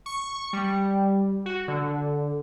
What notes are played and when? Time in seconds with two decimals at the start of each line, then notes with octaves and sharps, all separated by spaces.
0.06 C#6
0.53 G3
1.46 F#4
1.68 D3